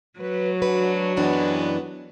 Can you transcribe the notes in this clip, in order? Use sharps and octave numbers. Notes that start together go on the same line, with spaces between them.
F#3 B4
D4 F#4 B4
F#2 E3 G3 G#3 B3 D4